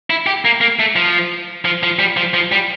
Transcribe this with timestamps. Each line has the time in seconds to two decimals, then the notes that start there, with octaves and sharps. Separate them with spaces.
0.10 E4
0.26 G4
0.45 A#3
0.61 A#3
0.79 A3
0.96 F3
1.65 F3
1.83 F3
1.99 G3
2.17 F3
2.34 F3
2.52 G3